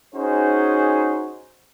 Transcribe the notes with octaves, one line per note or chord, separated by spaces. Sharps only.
C#4 D#4 F#4 G#4 C5